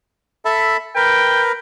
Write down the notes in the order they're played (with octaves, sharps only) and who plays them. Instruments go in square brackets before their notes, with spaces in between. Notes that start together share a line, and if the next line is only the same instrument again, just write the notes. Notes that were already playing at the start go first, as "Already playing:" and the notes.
[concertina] A4 E5 B5
[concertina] A#4 B4 [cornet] G5